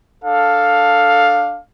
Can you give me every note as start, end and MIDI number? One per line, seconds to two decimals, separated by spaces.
0.23 1.60 62
0.23 1.60 69
0.23 1.60 77